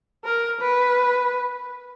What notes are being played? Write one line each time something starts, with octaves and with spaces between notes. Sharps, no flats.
A#4
B4